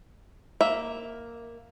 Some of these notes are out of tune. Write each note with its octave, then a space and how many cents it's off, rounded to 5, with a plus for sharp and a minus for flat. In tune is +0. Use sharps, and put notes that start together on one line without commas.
A#3 +0 E5 +0